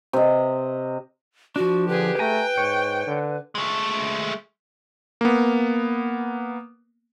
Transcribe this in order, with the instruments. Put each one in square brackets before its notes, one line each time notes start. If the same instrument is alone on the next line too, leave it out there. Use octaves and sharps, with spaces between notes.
[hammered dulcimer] C3 D#5
[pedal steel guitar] F3 D4 [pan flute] F#4
[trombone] D3 [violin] G4 G#4 [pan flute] B4
[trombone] A3 [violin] G5 [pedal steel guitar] G#5 A#5
[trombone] G#2 [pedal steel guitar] C#5
[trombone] D3
[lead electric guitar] G#3 A3
[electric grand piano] A#3 B3